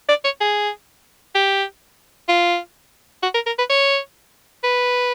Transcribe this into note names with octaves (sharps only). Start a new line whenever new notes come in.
D5
C#5
G#4
G4
F4
F#4
A#4
A#4
B4
C#5
B4